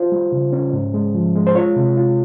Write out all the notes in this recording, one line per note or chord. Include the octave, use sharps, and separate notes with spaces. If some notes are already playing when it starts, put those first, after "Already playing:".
Already playing: F4 C5
G3
C#3
C#4
G#2
G#3
F3
G#3
C5
F4 C#5
C3
F4